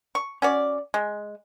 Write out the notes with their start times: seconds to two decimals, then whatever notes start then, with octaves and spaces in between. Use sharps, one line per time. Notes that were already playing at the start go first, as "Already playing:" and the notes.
0.15 C#6
0.42 C#4 F#4 D5
0.94 G#3